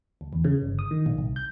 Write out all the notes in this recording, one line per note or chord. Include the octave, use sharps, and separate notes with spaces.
D2
E2
C#3
G1
D#6
D#3
A#1
C2
G6